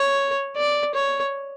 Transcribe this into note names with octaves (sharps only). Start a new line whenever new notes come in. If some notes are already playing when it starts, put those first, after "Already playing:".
Already playing: C#5
D5
C#5